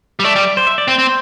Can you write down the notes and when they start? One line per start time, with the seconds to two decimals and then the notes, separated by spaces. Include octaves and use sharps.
0.20 G3
0.25 A3 D5
0.36 G3
0.57 C5
0.67 E5
0.78 D5
0.88 C4 C5
0.99 C4